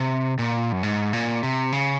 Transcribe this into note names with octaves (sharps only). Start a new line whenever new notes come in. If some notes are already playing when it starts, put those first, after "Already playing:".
Already playing: C3
A#2
F#2
G#2
A#2
C3
C#3